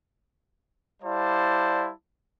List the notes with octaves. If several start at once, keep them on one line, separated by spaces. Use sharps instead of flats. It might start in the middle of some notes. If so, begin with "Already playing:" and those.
G3 E4 C5 D5 F5 A5